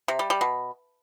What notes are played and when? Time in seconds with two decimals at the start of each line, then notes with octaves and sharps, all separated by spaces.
0.08 C3
0.19 G3
0.30 G3
0.41 B2